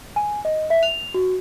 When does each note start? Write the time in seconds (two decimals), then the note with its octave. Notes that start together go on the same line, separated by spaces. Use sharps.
0.16 G#5
0.45 D#5
0.70 E5
0.83 F7
1.14 F#4